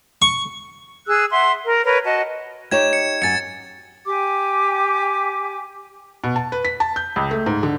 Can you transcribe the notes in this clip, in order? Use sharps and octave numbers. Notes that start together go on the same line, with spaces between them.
C#6
G#4 E6 F#6
E5 F#5 C6
A#4
A#4 B4 C#5
F#4 D#5 A5
D#4 G4 C#5 G#6 E7
C#7
F#2 G#5 A6 C#7
G4 G5 G#5 D6
B2
A5
B4
B6
A5
G6
C#2
A3
G#2
D3